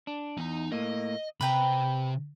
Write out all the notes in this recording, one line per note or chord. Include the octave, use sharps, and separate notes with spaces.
D4
E2 D#4 A#5
A2 A#3 D#5
C3 B4 G5 A#5 B5